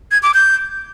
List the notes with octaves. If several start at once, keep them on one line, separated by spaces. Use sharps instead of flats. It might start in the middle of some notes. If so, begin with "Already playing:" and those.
G#6
D6
G6